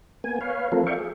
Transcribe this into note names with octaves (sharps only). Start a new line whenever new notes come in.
A#3 B3 G#5
B4 C#5 F5
F3 A3 C4 F4 A4 A#4
D5 E5 F5 G5 C#6
G#4